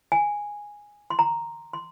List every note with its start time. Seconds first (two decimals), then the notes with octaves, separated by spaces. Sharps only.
0.12 G#5
1.10 C6
1.19 A#5
1.73 C6